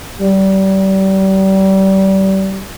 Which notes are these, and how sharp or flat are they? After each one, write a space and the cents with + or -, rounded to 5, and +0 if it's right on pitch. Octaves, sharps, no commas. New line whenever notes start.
G3 -30